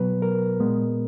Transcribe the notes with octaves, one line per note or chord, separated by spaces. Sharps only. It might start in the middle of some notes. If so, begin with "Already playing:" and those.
Already playing: B2 F#3 B3 B4
A#4
A#2 G#3 B3